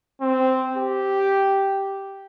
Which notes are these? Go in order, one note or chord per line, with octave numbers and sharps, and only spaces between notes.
C4
G4